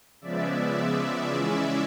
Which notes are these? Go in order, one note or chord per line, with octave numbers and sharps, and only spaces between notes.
C#3 F3 G#3 B3 D5 E5
D5 E5
C#3 E3 G#3 C#4